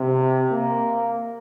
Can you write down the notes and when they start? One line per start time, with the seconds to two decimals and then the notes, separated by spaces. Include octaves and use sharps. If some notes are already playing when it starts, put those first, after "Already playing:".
Already playing: C3
0.51 A#3